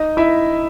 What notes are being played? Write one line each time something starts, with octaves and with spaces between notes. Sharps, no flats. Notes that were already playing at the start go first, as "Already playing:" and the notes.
Already playing: D#4 D#5
E4 E5